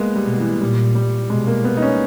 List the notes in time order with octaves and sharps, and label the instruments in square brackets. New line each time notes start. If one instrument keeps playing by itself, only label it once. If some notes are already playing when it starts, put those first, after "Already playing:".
Already playing: [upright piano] G#3 A#3 B3
G3
[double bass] B2
[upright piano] E3
[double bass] A#2 [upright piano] G3
[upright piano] G3
[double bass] B2 [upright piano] G#3
[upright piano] A#3
B3
D#4
C#4